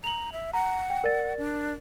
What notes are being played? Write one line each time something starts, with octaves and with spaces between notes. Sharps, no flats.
A#5 F7 F#7
E5
F#5 A#5
G5
A#4 D5 A6
D4